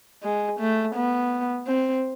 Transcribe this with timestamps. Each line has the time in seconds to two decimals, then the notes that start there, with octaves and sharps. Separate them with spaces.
0.23 G#3
0.60 A3
0.95 B3
1.67 C4